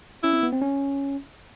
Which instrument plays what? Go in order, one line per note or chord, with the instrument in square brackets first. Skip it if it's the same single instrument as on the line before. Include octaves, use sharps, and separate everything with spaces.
[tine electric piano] C#4 [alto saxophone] E4
[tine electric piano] C4
B3
C4
C#4